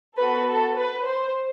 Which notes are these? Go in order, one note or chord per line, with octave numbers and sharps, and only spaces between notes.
B3 F#4 A4 B4
A4
B4
C5